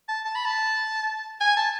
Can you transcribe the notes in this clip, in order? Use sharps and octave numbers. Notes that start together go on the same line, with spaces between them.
A5
A5
B5
A5
G#5
A5